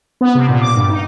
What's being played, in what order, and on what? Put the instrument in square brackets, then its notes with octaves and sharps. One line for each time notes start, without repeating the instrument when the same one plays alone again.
[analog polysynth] B3
C3
A#2
D6
G2
D#4